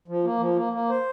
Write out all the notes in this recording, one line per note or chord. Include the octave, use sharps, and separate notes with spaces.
F3
A#3
F3
A#3
A#3
C5